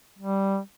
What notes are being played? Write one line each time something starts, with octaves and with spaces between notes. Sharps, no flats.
G3